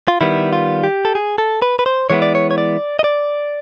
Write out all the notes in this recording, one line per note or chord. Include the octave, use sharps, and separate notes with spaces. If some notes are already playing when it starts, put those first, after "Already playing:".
F4
D#3 G3 B3 E4
F4
G4
A4
G#4
A4
B4
B4
C5
E3 G#3 B3 E4 C#5
D5
C#5
C#5
D5
D#5
D5